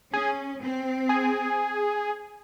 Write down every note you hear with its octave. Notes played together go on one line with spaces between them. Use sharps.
C#4 G#4
C4
G#4